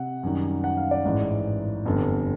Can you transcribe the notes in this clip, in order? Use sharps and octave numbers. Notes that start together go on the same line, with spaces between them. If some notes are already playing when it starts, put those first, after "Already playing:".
Already playing: C3 F#5
F#2 D#3 G3
F#5
F5
D5
A1 G#2 E3
G1 F2 D3 G3